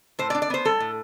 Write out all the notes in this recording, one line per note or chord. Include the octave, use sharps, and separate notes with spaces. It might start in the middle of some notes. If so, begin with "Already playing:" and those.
A2 C5
D5
D4
D5
B3 C5
G3 A4
A2